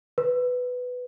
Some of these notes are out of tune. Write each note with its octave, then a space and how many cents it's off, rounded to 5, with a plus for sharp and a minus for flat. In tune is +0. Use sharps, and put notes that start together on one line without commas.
B4 +10